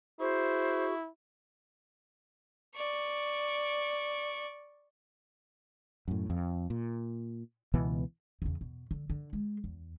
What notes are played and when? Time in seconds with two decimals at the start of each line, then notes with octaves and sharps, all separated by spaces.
0.20 E4 F#4 G#4 C5 C#6
2.76 D5 C#6
6.08 F#2 A2
6.30 F2
6.70 A#2
7.74 C#2 B2 E3 B3
8.42 E2 C#3
8.61 B2
8.91 D3
9.10 D3
9.33 G#3
9.64 E2